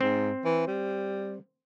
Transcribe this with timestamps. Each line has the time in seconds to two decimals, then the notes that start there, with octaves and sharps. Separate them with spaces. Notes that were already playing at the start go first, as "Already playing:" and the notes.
0.01 G#2 C4
0.45 E3
0.67 G3